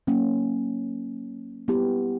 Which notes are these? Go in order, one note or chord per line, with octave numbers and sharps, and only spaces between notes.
F#3 A#3 C#4
G3 B3 E4 G4